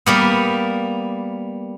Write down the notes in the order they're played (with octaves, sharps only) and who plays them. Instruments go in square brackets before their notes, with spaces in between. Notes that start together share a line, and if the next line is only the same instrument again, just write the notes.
[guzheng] G3 A#3 B3